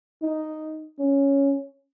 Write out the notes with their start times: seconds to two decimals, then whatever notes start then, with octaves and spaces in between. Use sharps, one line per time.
0.22 D#4
0.99 C#4